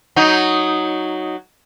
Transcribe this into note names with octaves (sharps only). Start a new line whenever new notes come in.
F#3 D#4